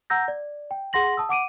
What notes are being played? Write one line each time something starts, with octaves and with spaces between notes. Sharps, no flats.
F#5 A#5 E6 G6 A#6
D5
G5
G#4 F#5 C6 A#6 F#7
A5 D#6 E6
F#5 D6 D7 D#7